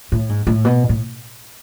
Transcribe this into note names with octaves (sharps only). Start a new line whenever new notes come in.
A2
G#2
A2
B2
A2